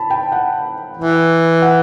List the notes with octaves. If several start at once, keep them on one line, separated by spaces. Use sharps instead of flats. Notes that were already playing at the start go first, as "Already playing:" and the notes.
Already playing: A5 B5
G5
F#5
E3
F#5